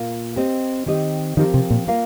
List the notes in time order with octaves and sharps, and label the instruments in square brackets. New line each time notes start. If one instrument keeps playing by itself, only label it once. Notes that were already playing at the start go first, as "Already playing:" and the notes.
Already playing: [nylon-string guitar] A#2 A#3 F4
C4 G4 C5 D#5
D#3 C4 G4 D#5
[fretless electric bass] D#3 [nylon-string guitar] F3 C4 G4 A#4
[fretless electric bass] C3
A#2
[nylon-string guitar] A#3 F4 A#4 F5